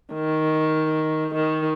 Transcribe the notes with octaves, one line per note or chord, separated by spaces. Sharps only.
D#3
D#3